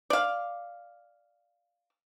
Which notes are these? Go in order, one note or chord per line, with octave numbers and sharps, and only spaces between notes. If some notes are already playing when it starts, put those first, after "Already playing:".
D5 F5